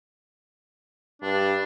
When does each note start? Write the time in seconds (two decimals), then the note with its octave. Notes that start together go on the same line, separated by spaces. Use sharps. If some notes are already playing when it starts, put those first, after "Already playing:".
1.22 G2 D4